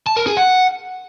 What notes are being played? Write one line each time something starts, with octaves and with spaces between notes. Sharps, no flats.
A5
A#4
G#4
F#5